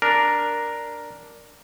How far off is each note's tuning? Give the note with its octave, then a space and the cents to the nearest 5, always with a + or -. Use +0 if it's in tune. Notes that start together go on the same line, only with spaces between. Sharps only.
D4 +0 A#4 +0